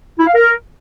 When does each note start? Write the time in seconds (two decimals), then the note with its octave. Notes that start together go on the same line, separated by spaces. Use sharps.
0.19 E4
0.27 F5
0.35 A#4